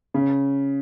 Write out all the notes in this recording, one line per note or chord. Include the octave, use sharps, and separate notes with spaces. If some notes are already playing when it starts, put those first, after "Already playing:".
C#3